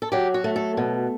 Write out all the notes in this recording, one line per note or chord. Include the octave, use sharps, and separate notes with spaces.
A4
F#3 G4
F#4
A3
A4
B2